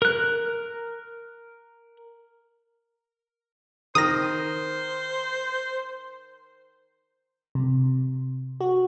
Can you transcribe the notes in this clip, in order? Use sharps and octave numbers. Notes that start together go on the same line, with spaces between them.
A#4 F#6
D#3 A#4 C5 D#6 A#6
C3
F#4